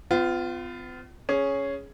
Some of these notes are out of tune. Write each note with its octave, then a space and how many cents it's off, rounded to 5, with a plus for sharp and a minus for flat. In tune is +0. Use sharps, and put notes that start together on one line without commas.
B3 +45 F4 +0
C#4 +0 G#4 +0